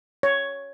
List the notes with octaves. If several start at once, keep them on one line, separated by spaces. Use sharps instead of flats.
C#5